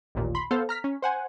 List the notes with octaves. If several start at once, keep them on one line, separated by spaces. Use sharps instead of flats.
A1 D#2 A#2
B5 C6
B3 A4 C5 F5
A#5 F6 B6
C#4
C5 F#5 G#5